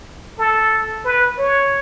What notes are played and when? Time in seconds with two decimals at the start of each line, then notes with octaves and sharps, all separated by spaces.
0.39 A4
1.05 B4
1.39 C#5